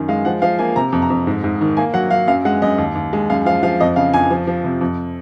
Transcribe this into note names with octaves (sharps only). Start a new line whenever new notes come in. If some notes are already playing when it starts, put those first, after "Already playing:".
Already playing: F#2 D#3
G#3 F5
F3 F#5
F3 F5
A#3 G#5
C3 A#5
F2
A#5
F2
G#2
G#2
D#3
A#3 G#5
F#3 F#5
F#3 F5
F#2 F5
G#3 F#5
F#2 D#5
D#2
D#2
G#3
F#2 F5
F3 F5
F3 F5
F2 D#5
C#3 F5
F2 G#5
F3
F3
C3
F2